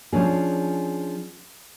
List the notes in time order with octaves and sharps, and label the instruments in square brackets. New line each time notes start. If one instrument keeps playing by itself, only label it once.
[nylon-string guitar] F3 C#4 D4 G#4